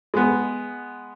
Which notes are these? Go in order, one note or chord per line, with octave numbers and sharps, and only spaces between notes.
G#3 B3